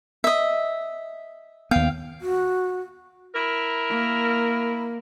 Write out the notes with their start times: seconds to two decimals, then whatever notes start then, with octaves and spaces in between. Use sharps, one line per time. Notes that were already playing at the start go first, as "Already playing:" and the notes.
0.24 D#5 E5
1.71 D#2 B3 F5 G5
2.21 F#4
3.35 E4 A#4
3.90 A#3